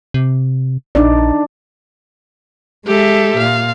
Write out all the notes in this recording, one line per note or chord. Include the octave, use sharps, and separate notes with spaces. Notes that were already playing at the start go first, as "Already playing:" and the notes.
C3
A#1 D4 D#4 D5
G#3 G4 A4 E5
A#2 F5